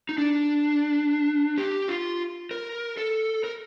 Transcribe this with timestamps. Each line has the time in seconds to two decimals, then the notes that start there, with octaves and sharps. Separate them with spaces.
0.09 D#4
0.18 D4
1.58 G4
1.88 F4
2.51 A#4
2.97 A4
3.44 A#4